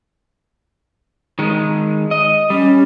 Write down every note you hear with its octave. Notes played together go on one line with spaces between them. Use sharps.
D#3 G#3
D#5
G3 C#4